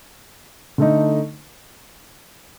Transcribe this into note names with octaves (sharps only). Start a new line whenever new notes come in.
D3 A3 D#4